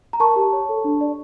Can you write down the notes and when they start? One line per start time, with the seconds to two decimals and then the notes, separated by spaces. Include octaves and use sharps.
0.13 A#5
0.20 A#4 A5 C#6
0.36 G4
0.53 C#5
0.69 A4
0.84 D4
1.01 D5